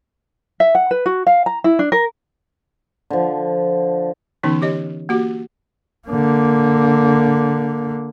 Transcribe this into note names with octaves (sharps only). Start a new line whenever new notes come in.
E5
F#5
B4
F#4
F5
A#5
E4
D4
A#4
D3 F3
D3 E3 B3 C#4 D#4
G4 C#5 D#5
A#3 F#4 G4
D3 A#3